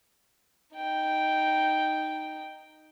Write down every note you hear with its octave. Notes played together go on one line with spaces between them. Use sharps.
D#4 G5